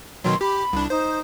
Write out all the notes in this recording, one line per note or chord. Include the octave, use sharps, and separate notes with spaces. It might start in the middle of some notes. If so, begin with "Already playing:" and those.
B2 D#3 F#3 C6
G4 B5
C2 D4
D#4 C5